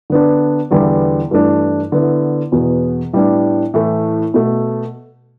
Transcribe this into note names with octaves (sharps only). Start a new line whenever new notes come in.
D3 B3 D4
E2 D3 G3 B3 E4
G2 E3 A3 D4
D3 B3 E4
E2 B2 B3
A2 G3 B3 D4
A2 E3 A3
B2 A3